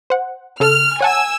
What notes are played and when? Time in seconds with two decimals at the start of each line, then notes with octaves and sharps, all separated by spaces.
0.10 C5 F#5
0.60 C#3 A4 E6 F6
1.01 C#5 F#5 G#5 A5 E6